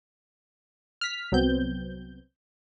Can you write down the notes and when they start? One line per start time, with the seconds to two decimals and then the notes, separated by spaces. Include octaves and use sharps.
1.01 F6 B6
1.32 C2 F#3 B3 C4 G6